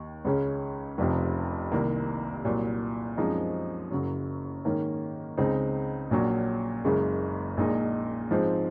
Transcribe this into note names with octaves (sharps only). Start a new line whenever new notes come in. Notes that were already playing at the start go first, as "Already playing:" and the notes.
Already playing: D#2 D#3
C#2 C#3 G#3 C#4
F1 F2 C3 F3
C2 C3 D#3 A#3
C2 A#2 F#3
F#2 F3 G#3 C4 D#4
F#1 F#2 C#3 F#3
G#2 D#3 A#3 C#4
C#2 C#3 G#3 C4 D#4
A#1 A#2 F#3 C#4
F#1 F#2 C#3 G#3
A#1 A#2 G#3 D#4
G#2 F3 G#3 C4